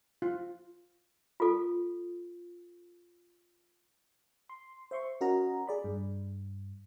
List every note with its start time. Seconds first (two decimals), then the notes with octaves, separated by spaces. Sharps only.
0.22 F4
1.40 F4 A4
4.49 C6
4.91 C5 E5 C6 C#6
5.21 C#4 F#4 A#4 D#5 A#5
5.67 G#4 D5 B5
5.84 G2